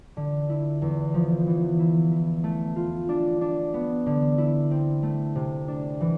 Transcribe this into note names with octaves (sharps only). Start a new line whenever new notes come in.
D3
E4
E2
F3
E3
E4
E4
A3
F4
D4
D4
B3
D3
E4
C4
A3
C3
D4
E3